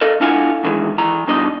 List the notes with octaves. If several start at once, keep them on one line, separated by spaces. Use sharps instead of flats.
A4 A#4 D#5 F5
D4 E4 F4 F5 F#5 G#5
F#2 D#3 E3 G#3
E3 A#5
G2 B2 D4 D#4 D#5